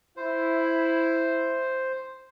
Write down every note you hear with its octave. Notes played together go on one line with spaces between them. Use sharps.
E4 C5